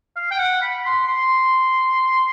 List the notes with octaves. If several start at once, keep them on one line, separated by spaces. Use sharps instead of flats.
F5
G5
F#5
B5
C6
C6